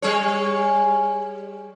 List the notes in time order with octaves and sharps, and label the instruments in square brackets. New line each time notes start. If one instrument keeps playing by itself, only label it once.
[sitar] G3 G#4 C#5